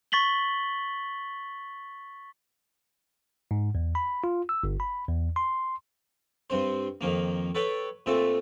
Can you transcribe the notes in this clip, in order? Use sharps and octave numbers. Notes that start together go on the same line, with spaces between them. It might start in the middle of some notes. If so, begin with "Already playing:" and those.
C#6 A6 B6 F#7 G7
G#2
E2
B5
F4
E6
G1
B5
E2
C6
G2 C4 C5
F2 D#3 A#3
A4 B4 C#5 G5
A#2 A3 C4 A4